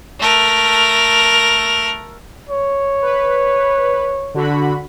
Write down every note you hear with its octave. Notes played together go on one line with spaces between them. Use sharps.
A3 A#4
C#5
B4
D3 F#4 B5